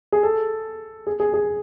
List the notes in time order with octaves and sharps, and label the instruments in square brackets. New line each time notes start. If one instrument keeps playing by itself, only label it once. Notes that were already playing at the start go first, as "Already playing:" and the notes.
[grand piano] G#4
A4
G#4
G#4
G#4